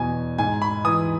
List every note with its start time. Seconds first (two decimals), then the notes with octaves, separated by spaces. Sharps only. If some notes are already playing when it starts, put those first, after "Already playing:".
Already playing: E2 B2 G#5
0.38 G#2 G#5
0.62 B5
0.85 E3 D#6